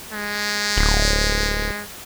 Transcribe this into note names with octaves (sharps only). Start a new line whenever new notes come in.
G#3
D1